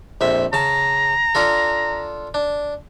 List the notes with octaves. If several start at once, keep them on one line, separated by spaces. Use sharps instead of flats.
A#1 F2 E5
C#3 A5 A#5
D4 F4 A4
D4